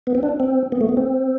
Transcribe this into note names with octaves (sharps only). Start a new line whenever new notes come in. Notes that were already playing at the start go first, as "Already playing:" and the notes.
B3
C4
D4
C4
B3
A3
B3
C4